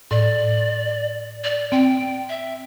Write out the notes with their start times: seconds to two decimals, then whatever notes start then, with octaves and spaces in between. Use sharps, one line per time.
0.11 A2 D5
1.44 D5
1.72 C4 G5
2.29 E5